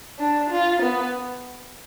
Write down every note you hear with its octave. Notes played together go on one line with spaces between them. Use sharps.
D4
F4
B3